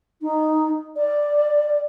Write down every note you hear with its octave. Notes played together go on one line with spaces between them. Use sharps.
D#4
D5